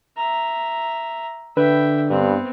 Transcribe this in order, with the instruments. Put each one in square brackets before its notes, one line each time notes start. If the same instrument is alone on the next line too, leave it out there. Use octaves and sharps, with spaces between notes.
[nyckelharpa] E5 A#5
[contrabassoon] D3 [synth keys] B4 [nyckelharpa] E5 G5
[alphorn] G2 [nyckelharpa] B3 C4